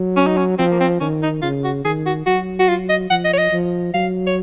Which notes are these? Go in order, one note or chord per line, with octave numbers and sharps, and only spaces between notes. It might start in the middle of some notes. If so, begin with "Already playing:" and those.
Already playing: F#3
C#4
D#4
C#4
F3 C4
A#3
C4
D#3 C#4
D#4
C#3 F4
F#4
D#3 G#4
F#4
F#3 F#4
F#4
F4
D#5
F3 F#5
D#5
C#5
D#5
F3
F#3 F5
C#5